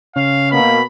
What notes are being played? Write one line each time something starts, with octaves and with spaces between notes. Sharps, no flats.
C#3 C#4 F5
B2 A#3 B5